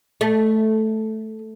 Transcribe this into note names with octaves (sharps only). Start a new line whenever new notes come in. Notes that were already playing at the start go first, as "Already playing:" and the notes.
A3